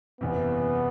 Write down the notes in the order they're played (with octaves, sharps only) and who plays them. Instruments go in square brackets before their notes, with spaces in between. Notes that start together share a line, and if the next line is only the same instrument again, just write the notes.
[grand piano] F#1 E2 C3 [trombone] B3